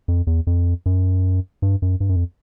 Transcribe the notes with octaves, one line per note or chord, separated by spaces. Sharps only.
F2
E2
F2
F#2
G2
F#2
G2
F#2
F2